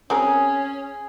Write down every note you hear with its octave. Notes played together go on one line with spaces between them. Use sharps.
C4 C#4 F#4 G#4 A#4